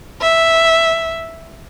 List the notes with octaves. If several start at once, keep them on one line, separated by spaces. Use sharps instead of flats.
E5